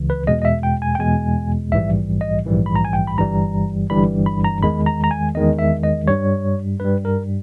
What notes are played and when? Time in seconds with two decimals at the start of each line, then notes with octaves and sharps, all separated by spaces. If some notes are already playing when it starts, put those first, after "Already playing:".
Already playing: C#2 C#3 E3
0.10 B4
0.27 E2 B2 G#3 D#5
0.42 D#5
0.45 E5
0.63 G5
0.82 G#5
0.95 G5
0.99 E2 B2 G#3 G#5
1.72 A#1 G#2 E3 G3 E5
2.21 D#5
2.45 A#1 G#2 E3 G3
2.66 B5
2.76 A#5
2.85 G#5
2.93 G5
3.07 B5
3.18 G1 G2 E3 G3 A#5
3.90 G1 G2 E3 G3 B5
4.26 B5
4.44 A#5
4.63 E2 D#3 G#3 B5
4.86 A#5
5.04 A#5
5.11 G#5
5.35 E2 D#3 G#3 D#5
5.59 E5
5.83 D#5
6.08 G2 G3 C#5
6.80 G2 G3 B4
7.05 A#4